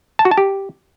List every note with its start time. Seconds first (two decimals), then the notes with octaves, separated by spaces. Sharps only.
0.19 A5
0.25 F#4
0.31 A5
0.37 G4